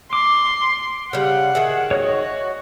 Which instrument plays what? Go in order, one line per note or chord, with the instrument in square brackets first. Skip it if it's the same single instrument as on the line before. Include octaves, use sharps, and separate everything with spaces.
[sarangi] C6 [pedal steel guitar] D6
[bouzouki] C#3 G3 [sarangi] F#5
[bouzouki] D#3 G#4 E5
[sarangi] F#4 [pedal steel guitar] C#5 D#5